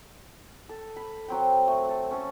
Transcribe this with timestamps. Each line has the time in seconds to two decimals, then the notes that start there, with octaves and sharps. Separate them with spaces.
0.69 A4
0.96 B5
1.28 F#3 C4 G5
1.68 A3
1.89 A4
2.11 C#4 A4